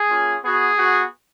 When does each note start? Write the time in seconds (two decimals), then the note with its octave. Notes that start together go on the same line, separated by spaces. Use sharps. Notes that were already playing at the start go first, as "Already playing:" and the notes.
Already playing: G#4
0.08 A#3 C#4 F4
0.42 B3 F#4 G#4
0.77 B3 F#4